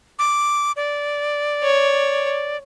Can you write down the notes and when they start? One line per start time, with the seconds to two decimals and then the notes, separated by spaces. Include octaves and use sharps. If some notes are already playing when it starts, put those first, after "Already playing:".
0.19 D6
0.76 D5
1.63 C#5